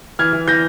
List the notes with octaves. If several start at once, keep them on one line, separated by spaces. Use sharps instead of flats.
E3 F6 G#6
E3
E3 G6 A#6